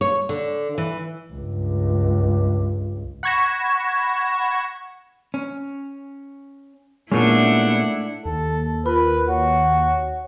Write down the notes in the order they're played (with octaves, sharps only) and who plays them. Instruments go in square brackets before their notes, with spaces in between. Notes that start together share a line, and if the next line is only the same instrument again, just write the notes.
[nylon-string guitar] C#5
D3
E3
[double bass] C#2 G2
[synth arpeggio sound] F#5 B5 C#6 G#6 A#6 E7
[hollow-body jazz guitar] C#4
[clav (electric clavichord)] A#2 C#4 [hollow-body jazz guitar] G#3 B3 [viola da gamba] A3 D4 [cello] E4 F#5
[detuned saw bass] D#2 [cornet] A4
[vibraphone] F4 A#4 B5 [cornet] B4
[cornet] F#4 [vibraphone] C#5